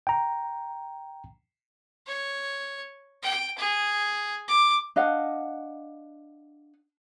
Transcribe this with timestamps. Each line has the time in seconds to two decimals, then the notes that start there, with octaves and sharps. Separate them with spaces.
0.07 G5 A#5
2.07 C#5
3.22 G5
3.58 G#4
4.48 D6
4.96 D4 D#5 F5 F#5